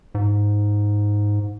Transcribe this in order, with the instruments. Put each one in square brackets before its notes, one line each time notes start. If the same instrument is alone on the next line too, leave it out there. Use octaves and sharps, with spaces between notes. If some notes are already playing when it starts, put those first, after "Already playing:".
[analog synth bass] G#2